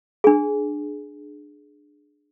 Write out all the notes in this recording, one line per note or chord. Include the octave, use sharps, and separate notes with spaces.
D4 G#4